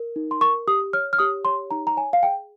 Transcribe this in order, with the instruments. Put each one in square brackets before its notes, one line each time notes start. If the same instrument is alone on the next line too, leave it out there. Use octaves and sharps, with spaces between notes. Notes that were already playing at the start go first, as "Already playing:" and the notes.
Already playing: [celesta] A#4
D#4
C6
A#4 C#6
G4 D#6
C#5 F6
F6
G4 D#6
C#5 C6
D#4 A#5
A#5
C#5 G#5
F5
G#4 G5